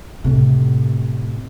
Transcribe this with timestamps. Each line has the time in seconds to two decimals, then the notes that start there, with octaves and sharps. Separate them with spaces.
0.24 A2 C3